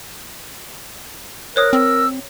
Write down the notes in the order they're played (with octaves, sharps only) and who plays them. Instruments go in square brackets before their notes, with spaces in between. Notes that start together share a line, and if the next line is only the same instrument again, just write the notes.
[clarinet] A#4 [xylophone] C5 C#5 D#6 [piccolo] F#6
[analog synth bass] C4 [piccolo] E6